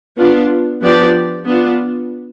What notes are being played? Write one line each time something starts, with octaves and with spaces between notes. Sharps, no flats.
B3 D4 F4
F3 B3 D4 G4 D5
B3 D4 F4